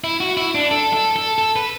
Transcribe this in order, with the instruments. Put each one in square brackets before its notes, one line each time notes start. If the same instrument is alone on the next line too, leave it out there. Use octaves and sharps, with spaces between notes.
[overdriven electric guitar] E4
F#4
E4
D4
A4
A4
A4
A4
B4